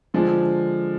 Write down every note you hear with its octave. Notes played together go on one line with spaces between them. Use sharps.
D3 F3 G#3 D4